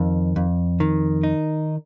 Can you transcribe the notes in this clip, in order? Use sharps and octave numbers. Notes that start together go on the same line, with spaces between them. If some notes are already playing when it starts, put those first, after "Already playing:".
Already playing: F2 D#3
F2
D#3
D#4